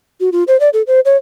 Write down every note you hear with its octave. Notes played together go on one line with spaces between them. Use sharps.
F#4
F4
C5
D5
A4
C5
C#5